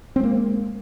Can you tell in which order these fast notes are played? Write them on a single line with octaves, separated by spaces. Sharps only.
C4 G#3 A#3